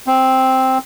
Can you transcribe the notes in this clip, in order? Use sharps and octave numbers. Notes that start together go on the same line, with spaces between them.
C4